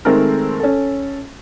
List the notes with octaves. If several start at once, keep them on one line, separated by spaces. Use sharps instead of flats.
D#3 G#3 A3 C4 A4 A#4
C#4 A4